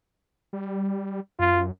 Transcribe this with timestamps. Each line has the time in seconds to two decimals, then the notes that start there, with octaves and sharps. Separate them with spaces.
0.53 G3
1.39 F#2 F4